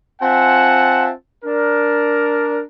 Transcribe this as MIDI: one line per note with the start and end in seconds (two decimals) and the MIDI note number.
0.21 1.10 60
0.21 1.10 65
0.21 1.10 76
0.21 1.10 78
0.21 1.10 80
0.21 1.10 81
1.45 2.61 62
1.45 2.61 70